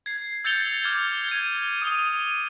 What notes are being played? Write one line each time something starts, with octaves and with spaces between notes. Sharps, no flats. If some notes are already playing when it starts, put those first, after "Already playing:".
G#6 C7
E6 G6 A6 C#7 F7 G7
D6 F6 G#6 F7
G#6 D#7
D#6 D#7 G7